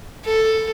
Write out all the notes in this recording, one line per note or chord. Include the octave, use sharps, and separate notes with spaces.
A4